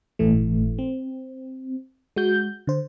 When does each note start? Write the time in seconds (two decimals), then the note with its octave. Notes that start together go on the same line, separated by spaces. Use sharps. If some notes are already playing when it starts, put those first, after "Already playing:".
0.19 G1 A2 E3 A3
0.79 C4
2.16 G#3 F#4 G6
2.67 D3 C5